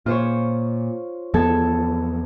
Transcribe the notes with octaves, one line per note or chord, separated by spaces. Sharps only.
A#2 F4 C5 C#5
E2 F3 B3 A4 A5 G#6